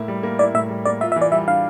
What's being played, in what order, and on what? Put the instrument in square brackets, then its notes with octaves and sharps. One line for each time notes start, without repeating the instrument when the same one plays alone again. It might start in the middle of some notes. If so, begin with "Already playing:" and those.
Already playing: [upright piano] A2 A#3 E4
G3
A#3
[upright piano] E4 [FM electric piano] D5
[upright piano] A2 [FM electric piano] E5
[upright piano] G3
[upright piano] A#3 [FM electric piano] D5
[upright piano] F4 [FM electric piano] E5
[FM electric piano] E5
[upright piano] E3
[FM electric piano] D5
[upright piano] G3 [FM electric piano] E5
[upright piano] D4 [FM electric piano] F5